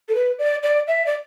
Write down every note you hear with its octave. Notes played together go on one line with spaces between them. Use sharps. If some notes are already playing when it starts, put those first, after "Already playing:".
A4
B4
D5
D5
E5
D5